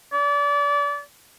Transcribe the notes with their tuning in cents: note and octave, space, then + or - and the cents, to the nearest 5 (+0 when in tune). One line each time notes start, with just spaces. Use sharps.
D5 -30